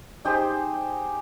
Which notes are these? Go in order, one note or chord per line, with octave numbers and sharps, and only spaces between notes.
D#4 G4 G#4 C5